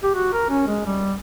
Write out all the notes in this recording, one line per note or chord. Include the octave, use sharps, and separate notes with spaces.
G4
F#4
A#4
C#4
G#3
G3